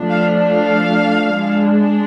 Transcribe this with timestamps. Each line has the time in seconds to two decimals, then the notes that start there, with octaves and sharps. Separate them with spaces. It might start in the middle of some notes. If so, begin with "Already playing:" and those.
Already playing: F3 A3 D4
0.09 F5
0.52 F5
1.36 G#3 D4